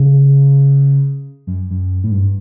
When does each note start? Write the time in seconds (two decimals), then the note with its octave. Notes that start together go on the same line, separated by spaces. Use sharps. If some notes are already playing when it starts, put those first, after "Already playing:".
Already playing: C#3
1.47 F#2
1.71 F#2
2.04 A2
2.11 G2